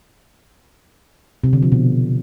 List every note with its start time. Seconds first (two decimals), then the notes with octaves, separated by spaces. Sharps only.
1.44 C3
1.53 D3
1.62 F3
1.72 B2